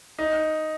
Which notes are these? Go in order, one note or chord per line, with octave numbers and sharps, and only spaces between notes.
D#4